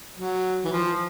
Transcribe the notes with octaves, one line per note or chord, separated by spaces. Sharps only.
F#3
E3
F3